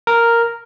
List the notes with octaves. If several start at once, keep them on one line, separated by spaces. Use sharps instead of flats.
A#4